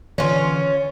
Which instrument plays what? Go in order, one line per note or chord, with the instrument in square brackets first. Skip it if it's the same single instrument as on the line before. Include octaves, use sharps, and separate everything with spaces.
[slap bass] D3 E3 [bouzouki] C#4 F4